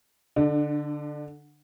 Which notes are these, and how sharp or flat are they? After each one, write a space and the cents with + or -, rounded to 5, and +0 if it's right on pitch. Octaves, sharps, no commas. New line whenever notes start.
D3 +0 D4 +30